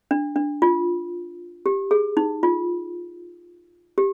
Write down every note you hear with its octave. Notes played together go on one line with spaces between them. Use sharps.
D4
D4
F4
G4
G#4
D#4
F4
G4